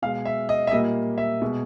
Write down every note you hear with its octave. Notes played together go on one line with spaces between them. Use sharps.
B2 G#3 F5
E5
D#5
E5
A#2 G3 A#3 D#5
E5
B2 G#3